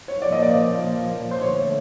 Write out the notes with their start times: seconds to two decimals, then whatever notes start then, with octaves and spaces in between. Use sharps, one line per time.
0.08 C#5
0.22 A#2 F3 A#3 D5
0.32 D#5
0.43 D5
1.31 C5
1.41 D3 F3 A3 C#5